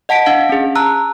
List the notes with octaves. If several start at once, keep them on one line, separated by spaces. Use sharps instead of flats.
D#5 F#5 A5 B6 D7
D4 F5 F#5
C#4 G#4
A5 A#5 E6 F#6